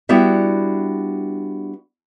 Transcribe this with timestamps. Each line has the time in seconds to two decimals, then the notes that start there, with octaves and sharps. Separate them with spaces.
0.09 G3 B3 D4 E4 F#4 E5